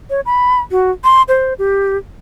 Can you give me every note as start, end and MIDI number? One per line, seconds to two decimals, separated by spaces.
0.10 0.21 73
0.26 0.60 83
0.71 0.91 66
1.04 1.22 84
1.29 1.54 72
1.59 1.97 67